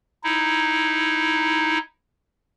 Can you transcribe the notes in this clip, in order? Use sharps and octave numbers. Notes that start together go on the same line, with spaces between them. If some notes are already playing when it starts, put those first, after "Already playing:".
D#4 E4